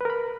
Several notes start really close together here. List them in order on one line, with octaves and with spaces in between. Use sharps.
B4 A#4 B5